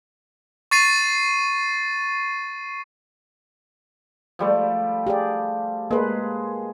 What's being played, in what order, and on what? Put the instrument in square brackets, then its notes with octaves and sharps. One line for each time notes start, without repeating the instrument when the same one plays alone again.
[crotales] C#6 A6 C7 D#7
[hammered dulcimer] F3 G3 A3
[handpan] G4 G#4 D5
[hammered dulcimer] G#3 [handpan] A#3 B4